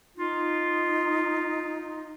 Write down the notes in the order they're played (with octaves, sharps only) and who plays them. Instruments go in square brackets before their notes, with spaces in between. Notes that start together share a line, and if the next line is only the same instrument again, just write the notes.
[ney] D#4 [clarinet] F4